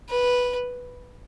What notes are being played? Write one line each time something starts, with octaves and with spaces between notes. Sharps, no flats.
B4